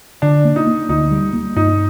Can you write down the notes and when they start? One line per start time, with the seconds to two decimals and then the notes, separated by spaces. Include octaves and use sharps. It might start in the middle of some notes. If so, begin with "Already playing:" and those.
0.22 D3 D4
0.45 A#3
0.56 D#4
0.67 A#3
0.89 D2 D#4
1.11 G3
1.33 A#3
1.56 G2 D#4